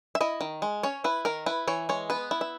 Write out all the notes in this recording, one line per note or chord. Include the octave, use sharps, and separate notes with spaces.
E5
E4 D#5
D#3
G#3
C#4 C#5
E4 B4
D#3 A#4
E4 B4
E3 C#5
G#3 C#5
B3 B4
E4
E5